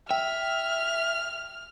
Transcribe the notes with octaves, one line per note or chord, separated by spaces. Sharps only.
E5 G5 F6